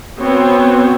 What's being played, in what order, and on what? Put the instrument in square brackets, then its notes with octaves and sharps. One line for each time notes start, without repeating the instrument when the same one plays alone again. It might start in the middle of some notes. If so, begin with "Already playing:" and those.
[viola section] B3 C4 F#4 C5 C#5